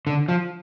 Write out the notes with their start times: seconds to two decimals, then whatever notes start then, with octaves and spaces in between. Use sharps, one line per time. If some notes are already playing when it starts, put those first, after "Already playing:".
0.07 D3
0.28 F3